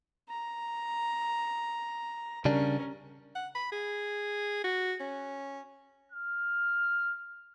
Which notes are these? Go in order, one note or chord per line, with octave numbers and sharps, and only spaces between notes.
A#5
C#3 G3 C#4 D4 A#4
F#5
B5
G#4
F#4
C#4
F6